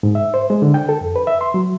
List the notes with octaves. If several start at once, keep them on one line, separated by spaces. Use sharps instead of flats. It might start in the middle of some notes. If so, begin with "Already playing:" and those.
G#2
E5
C5
G#3
D3
G5
A4
F2
B4
E5
C6
F#3